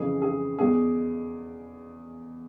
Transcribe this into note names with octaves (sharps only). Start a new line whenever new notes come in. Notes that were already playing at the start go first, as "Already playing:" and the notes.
Already playing: F2 C#3 E3 G#4
G#4
E2 B2 G#4